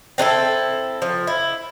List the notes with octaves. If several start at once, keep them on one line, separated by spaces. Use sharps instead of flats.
C4 D4 E4 A4
F3
E4